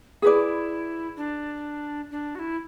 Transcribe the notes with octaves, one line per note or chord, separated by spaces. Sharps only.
E4 F#4 G#4 B4 D5
D4
D4
F#4
E4